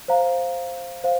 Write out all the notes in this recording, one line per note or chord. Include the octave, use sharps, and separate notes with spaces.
C5 F5 A#5
C5 F5